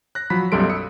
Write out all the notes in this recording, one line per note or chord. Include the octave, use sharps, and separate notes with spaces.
F#6 A#6
F3 F#3 B5 B6
B1 F#2 G3 A4 C6 D7
D#6 E6 C#7